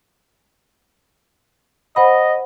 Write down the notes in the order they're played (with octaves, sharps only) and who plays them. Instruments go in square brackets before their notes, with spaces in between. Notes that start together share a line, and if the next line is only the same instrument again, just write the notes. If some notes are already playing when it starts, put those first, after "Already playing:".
[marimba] C5 F#5 B5 [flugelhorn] D#5